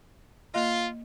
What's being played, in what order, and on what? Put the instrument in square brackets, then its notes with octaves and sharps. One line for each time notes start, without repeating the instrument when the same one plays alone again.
[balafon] A#3 D#5 [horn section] F4